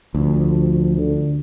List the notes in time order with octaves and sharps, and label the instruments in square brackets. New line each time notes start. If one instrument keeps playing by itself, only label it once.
[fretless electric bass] D2 [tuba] F3
[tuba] D3